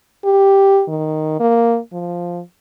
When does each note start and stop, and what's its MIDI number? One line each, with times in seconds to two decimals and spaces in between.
0.25 0.83 67
0.88 1.36 51
1.40 1.79 58
1.93 2.40 53